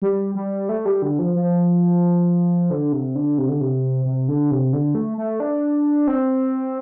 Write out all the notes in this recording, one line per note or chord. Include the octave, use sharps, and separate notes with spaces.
G3
G3
A3
G3
D3
F3
F3
D3
C3
D3
C3
D3
C3
C3
D3
C3
D3
A3
A3
D4
C4